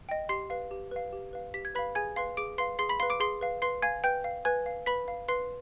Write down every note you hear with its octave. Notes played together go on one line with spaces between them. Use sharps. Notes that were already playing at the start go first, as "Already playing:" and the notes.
D#5 G5
G4 C6 C7
B4 F5
G4
B4 F5
G4
B4 F5
G4 B6
G#6
B4 F5 B5 B6
G#4 G#5 G#6
B4 F5 C6 C7
G#4 D6 D7
B4 F5 C6 C7
G#4 C6 C7
B5 B6
B4 F5 C6 C7
D6 D7
G#4 C6 C7
B4 F5
B4 C6 C7
F5 G#5 G#6
B4 G5 G6
F5
B4 G#5 G#6
F5
B4 B5 B6
F5
B4 C6 C7